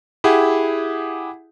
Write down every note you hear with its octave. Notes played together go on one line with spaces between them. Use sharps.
E4 G4 G#4 F#5